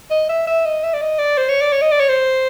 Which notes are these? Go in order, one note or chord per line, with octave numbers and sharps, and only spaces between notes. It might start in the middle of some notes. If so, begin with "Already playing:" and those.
D#5
E5
E5
D#5
E5
D5
D#5
D5
C5
C#5
D5
C#5
D#5
D5
C#5
C5